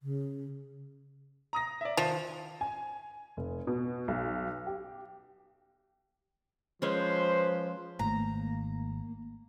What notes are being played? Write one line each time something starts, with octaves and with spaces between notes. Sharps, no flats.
C#3
A#5 D#6 A#6
D5 E5
D#3 F3
G#5
F1
B2
B1
G4
F3 G#3 C#4 B4 C5
G#1 G#2 D#3 A3 A#3 A#5